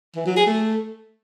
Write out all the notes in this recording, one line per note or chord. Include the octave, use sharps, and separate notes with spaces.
E3
F#3
G#4
A3